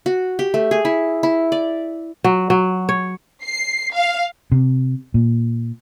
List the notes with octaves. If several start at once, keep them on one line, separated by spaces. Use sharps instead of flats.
F#4
G4
A3
G#4
E4
E4
D5
F#3
F#3
C#5
C7
F5
C3
A#2